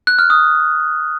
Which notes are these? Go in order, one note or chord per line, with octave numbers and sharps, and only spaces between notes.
F#6
F6
D#6